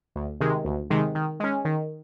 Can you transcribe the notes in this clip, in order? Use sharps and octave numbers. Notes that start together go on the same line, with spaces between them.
D2
C3 D#3 G#3
D2
C3 D#3 G#3
D#3
G#3 C#4
D#3